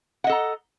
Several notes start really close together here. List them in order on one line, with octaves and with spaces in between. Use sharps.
F#5 D#5 A4 A#5